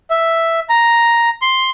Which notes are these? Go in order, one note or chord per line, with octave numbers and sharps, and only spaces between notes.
E5
A#5
C6